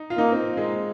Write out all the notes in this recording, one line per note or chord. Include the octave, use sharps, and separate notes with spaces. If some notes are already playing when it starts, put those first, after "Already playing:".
Already playing: D#4
F4
A#3 D#4
C4
G#3